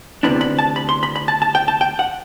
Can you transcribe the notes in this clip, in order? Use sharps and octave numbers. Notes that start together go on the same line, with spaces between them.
D2 C3 E3 B3 D4 B5
B5
A5
B5
C6
B5
B5
A5
A5
G5
A5
G5
F#5